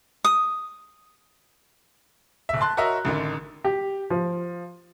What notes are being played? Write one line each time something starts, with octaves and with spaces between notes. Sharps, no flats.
D#6
D1 E5
A5 C6 F#6
F#4 A#4 C#5 D#5 E5 A#5
A1 D3 D#3
G4
F3